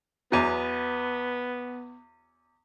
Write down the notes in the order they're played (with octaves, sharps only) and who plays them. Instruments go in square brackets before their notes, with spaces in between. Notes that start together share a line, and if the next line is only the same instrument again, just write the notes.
[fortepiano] E2 F#3 [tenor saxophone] B3